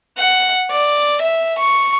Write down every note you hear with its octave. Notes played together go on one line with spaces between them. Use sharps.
F#5
D5
E5
C#6